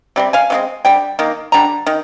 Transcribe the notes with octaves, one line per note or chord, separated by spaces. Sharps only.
C3 G3 C4
F5 G#5
C3 D#3 G#3 C4
D3 G3 G5
D#3 A#3
D3 G3 A#5
D#3